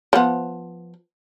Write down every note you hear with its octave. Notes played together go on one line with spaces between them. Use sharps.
F3 B3